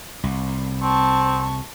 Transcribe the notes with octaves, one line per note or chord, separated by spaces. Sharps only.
C2
C4 A5 C#6